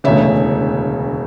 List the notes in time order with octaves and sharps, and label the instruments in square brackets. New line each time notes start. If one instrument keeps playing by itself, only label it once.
[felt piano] E1 D2 C#3 C#5 E5